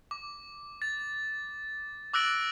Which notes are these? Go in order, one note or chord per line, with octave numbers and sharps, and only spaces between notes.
D6
A6
D6 E6 F#6 A#6 D7 F#7